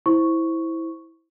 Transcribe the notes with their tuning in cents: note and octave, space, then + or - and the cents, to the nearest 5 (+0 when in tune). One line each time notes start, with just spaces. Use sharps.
E4 -10 C5 +0 C#6 +0